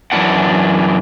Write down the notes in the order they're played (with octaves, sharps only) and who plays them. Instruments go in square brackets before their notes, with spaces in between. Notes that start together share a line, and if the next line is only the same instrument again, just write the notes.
[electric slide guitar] F#2 D#3 E3 D4 F#5